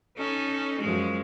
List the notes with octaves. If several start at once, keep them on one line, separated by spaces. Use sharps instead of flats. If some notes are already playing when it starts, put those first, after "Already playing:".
C#4 D#4 A4
F#2 F3 G#3